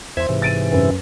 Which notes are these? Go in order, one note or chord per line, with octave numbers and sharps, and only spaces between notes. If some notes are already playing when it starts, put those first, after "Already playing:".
E2 C5 E5 C6 G#6
G#2 C3 E3
A6 D7 D#7
F#2 B4